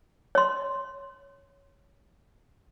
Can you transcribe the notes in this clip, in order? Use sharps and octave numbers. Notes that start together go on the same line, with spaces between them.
C#5 C6